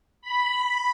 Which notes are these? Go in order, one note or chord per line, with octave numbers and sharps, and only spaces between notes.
B5